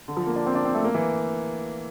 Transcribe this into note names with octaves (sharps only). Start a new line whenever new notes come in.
D3
F3
A#3
D4
C4
D4
C4
A3
A#3
E3